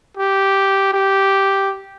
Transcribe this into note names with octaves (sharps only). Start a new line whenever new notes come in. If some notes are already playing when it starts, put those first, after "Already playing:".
G4
G4